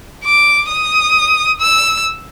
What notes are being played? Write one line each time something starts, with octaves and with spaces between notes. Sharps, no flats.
D6
D#6
E6